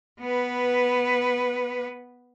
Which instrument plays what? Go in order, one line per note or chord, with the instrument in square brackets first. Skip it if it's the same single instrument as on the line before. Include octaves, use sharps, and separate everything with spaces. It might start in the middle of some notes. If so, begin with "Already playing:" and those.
[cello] B3 B4